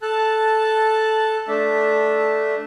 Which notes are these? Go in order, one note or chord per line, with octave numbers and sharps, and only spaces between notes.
A4 A5 F#6
A3 D4 E5